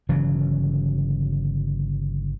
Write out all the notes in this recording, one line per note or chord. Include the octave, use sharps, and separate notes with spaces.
G1 C#3 E3 F#3